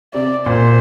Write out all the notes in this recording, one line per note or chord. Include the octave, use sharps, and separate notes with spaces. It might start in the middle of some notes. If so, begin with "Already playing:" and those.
C3 D5
A#2 C5